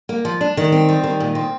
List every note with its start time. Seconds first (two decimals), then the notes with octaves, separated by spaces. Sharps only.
0.09 A#3
0.25 F3
0.41 D4
0.57 D#3
0.72 C4
0.89 G3
1.04 D#3
1.20 A#2
1.35 C4